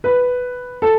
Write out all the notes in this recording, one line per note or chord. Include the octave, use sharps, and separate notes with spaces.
B4
A4